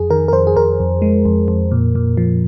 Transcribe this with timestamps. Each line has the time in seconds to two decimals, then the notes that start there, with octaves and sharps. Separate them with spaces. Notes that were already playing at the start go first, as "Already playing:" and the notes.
Already playing: F2 G#4
0.10 D#3 A#4
0.28 A#4
0.33 F2 C5
0.47 G#4
0.56 F2 A#4
0.80 F2
1.02 G#3
1.25 F2
1.48 F2
1.72 A#2
1.95 A#2
2.17 F3